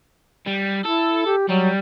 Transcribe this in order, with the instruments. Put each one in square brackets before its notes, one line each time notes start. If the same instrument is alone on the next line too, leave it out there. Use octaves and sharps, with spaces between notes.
[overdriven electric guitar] G3
[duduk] E4 [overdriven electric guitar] A4
[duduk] G4
[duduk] F#3 [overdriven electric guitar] G3